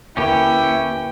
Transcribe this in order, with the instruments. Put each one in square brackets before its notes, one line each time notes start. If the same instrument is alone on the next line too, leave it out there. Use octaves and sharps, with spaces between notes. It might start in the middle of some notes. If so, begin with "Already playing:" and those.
[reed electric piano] D2 A#3 B4 [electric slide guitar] C#4 G4 [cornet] E4 [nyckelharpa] G5